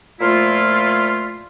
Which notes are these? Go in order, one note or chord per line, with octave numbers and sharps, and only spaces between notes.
A#2 F3 A3 E4 F4